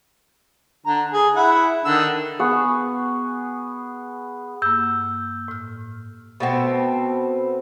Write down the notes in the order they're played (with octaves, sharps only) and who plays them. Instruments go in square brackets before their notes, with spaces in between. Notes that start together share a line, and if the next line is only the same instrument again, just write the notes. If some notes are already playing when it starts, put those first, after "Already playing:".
[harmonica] D3 A#5
G#4
E4 F#5
D3 D#3 E6
[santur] B3 G#4 C#6
[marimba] G2 A#3 [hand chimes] E6 G6
[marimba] A2 F6
[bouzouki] B2 A3 B3 C4